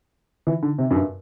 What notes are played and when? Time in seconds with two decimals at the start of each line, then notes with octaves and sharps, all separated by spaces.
0.47 E3
0.62 D3
0.79 C3
0.90 F#2
0.95 G2